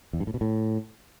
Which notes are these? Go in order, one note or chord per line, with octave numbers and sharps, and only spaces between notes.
E2
G2
A2
B2
A2